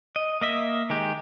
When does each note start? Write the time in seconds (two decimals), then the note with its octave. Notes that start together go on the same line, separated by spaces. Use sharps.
0.16 D#5
0.41 A#3 D#5 E5
0.90 D#3 G#3 G4